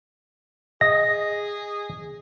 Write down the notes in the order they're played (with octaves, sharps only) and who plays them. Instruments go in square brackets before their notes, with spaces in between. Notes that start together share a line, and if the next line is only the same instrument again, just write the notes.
[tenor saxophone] G#4 [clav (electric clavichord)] D#5 [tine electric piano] A#6